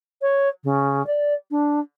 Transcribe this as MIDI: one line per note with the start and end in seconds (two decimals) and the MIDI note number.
0.22 0.49 73
0.64 1.05 49
1.07 1.34 74
1.51 1.80 62